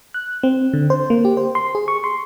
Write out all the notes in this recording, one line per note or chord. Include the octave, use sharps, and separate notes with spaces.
F#6
C4
D3
C5
A#3
G4
C5
C6
G#4
C#6
C6